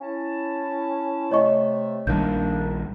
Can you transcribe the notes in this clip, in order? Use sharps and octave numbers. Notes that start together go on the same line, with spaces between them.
C#4 E4 A5
C3 A3 C#5 D#5 C#6
A#1 D#3 G3 A#3 D4 G6